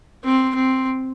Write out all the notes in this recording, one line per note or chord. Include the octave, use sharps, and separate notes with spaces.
C4
C4